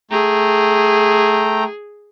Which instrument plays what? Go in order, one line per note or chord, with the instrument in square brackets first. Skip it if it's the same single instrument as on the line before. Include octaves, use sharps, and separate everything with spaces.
[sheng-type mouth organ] A3 G5 A#5 [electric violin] G#4